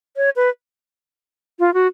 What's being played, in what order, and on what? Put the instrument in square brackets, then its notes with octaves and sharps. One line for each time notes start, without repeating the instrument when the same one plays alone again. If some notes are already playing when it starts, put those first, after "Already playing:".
[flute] C#5
B4
F4
F#4